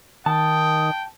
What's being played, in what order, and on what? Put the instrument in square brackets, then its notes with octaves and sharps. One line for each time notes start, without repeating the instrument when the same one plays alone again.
[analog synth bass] D#3 [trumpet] G5 [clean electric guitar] A5 [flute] D#6